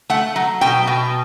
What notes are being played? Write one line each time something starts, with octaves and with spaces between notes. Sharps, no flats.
A3 F#5
F#3
B2 G5
B2